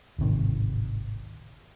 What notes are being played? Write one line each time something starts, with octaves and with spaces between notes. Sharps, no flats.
D1 G#1 C3 D#3